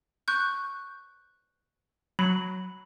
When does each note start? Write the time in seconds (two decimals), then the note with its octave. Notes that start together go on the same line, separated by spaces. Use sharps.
0.28 C#6 F#6 G6
2.19 F#3 B5